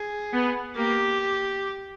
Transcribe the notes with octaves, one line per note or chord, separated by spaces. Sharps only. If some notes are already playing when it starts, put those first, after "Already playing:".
Already playing: G#4
B3
A#3 G4